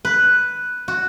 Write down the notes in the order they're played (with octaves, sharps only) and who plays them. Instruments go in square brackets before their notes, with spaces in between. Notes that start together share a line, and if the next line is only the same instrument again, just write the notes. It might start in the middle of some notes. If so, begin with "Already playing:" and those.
[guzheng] B4
F#4